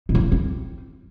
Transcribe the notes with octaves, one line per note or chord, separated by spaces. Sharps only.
B2
F3
E3
D3
C4